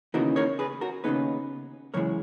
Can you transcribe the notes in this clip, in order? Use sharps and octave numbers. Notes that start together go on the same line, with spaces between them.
D#2 C#3 E3 B3 D#4 F#4 A#4
A#4 C#5
G#4 B4
F#4 A#4
D#2 C#3 E3 B3 D#4 G#4 B4
F#2 C#3 E3 G#3 A#4 C#5